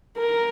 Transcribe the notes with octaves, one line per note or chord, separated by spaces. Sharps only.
A#4